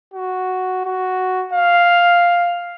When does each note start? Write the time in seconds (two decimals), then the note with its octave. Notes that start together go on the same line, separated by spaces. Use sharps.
0.13 F#4
0.85 F#4
1.54 F5